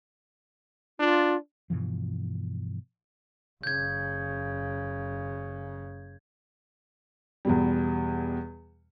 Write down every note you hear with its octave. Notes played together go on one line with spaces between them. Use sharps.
D4 F4
G2 B2 E3 F3
F#1 C#3 G6 G#6
E2 B2 G3